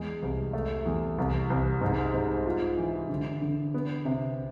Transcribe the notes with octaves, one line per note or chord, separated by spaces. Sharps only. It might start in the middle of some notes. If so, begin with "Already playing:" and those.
Already playing: E2 G#3
C2
A3
E2
C2
C2
G#2
G#2
F4
E3
D3
D3
B3
C3